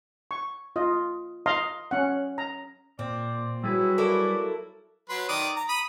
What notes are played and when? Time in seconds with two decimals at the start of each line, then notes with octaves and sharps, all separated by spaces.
0.31 C#6
0.76 F4 D#5
1.46 D#5 F5 A#5 C6
1.91 C#4 F#5
2.38 A#5
2.99 A#2 C4 D5
3.64 F#3 G3 E4 F#4 G#4 B4
3.98 A#3 E4 A4 D5
5.09 F#3 B4 C6
5.29 D#3 D5 D#6
5.56 A#5
5.69 B5 D#6